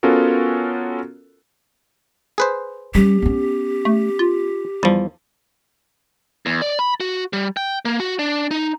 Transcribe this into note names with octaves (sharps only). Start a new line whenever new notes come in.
B3 C#4 F4 F#4 A4 A#4
G#4 B4 C5
G3 C#4 G4
B3 C#4
A3
F4
E2 F3 G3
E2
D5
B5
F#4
G3
G5
A#3
F#4
D4
D#4